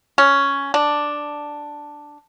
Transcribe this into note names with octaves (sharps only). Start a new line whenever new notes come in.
C#4
D4